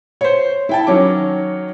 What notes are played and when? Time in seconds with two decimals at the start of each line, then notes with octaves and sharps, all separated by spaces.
0.21 C5 C#5
0.69 E4 G5 A5
0.87 D#3 F#3 C#4 C#5 D6